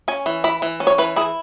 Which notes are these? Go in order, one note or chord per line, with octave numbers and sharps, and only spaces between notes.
C#4 G#5
E3
E4 B5
E3
C#4
C#5
E3 B4
E4 G#4